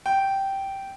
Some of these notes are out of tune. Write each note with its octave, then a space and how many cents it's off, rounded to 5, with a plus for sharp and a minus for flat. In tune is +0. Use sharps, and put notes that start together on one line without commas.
G5 -10